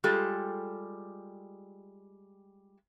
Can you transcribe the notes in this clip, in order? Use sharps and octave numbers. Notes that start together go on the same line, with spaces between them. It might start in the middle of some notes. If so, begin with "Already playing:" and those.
G3 G#3 F4 G4 A4